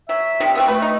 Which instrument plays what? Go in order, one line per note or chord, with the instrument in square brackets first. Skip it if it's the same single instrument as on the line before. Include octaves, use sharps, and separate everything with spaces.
[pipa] F#3 [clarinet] E5
[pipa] C3 D#3 G3
B3 C4 F#4
[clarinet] A3 [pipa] B4
[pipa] D#4